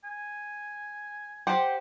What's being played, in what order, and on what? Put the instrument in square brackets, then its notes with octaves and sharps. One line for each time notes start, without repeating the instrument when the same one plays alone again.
[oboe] G#5
[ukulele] G4 C5 F#5 [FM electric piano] G5 C6 D6